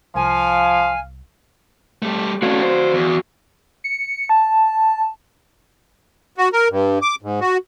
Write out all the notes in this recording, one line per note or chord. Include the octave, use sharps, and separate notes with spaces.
C2 F3 F5 G#5
G3 A3
A3 C#4 F#4 D5 F5
C5
E2
C#7
A5
F#4
A#4
G2
D6
G#2
F#4